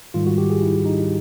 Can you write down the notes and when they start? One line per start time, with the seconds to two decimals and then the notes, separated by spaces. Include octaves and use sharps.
0.14 G#2 D#3 G3 F4
0.27 F#4
0.38 G4
0.50 G#4
0.62 E4
0.86 D#4